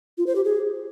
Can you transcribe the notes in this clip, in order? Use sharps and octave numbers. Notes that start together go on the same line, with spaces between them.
F4
C5
G4
G#4